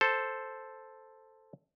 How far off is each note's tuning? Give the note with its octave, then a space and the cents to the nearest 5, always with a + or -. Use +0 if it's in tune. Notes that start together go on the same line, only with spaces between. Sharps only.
A4 +0 C5 +0